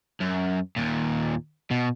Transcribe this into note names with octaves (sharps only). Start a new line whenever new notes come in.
F#2
D#2 A#2
B2